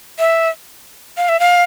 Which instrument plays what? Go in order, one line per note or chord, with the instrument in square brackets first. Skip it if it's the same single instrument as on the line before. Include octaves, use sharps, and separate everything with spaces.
[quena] E5
F5
E5
F5